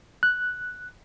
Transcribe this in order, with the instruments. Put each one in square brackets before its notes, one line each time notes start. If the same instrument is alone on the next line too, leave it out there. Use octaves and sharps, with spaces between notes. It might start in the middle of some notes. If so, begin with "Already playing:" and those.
[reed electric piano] F#6